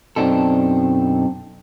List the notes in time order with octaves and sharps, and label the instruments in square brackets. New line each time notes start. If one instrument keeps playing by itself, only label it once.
[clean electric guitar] F#2 B2 C4 D4 D#4 A4